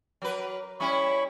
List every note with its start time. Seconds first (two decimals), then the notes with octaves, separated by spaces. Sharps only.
0.22 F#3 A#4 B4
0.80 G3 C#4 E4 B5 C#6